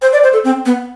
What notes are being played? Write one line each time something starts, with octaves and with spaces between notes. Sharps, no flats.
C5
D5
C5
A4
C4
B3